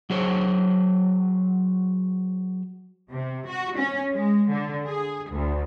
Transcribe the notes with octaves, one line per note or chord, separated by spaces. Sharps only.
F#3 G#4 C5 C#5
C3
F#4
C#4
G#3
D3
G#4
D2